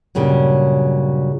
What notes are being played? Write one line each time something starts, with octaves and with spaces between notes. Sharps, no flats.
G2 A#2 C#3 F#3 G3